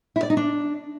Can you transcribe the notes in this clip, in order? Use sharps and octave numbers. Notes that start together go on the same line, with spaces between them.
E4
D5
D#4
D4